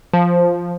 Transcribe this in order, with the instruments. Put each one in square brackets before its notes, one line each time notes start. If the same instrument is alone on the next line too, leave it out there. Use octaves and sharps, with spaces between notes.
[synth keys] F3